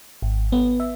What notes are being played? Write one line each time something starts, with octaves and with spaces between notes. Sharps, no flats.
G#1
B3
E5